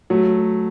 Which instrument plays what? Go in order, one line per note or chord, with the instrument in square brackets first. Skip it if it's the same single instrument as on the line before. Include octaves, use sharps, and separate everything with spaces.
[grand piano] F#3 A3